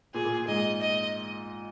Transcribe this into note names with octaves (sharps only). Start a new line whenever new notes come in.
A#2 G#4
A#2
G#2 D#5
D#5